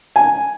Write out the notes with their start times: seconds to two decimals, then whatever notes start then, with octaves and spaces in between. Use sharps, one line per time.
0.16 G#5